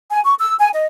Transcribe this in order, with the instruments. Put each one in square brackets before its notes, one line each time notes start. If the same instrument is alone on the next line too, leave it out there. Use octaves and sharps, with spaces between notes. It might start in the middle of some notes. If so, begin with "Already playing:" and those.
[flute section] G#5
C#6
E6
G#5
D#5